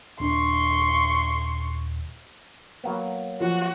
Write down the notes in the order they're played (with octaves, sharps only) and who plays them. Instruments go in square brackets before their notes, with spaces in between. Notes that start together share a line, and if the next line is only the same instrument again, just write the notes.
[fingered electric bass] D#1 D4 [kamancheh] C6 C#6
[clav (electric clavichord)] F#3 A#3 B3
[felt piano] F3 [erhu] F#4